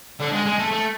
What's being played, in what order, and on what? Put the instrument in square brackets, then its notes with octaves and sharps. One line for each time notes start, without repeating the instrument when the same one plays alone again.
[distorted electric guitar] D3
G#3
G#3
A3
A3